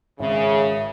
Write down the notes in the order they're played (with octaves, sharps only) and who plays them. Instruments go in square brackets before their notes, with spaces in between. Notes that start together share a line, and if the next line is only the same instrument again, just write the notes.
[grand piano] G#1 [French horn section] C#3 [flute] E5